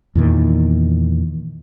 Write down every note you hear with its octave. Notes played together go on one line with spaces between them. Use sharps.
E2 A#2 D#3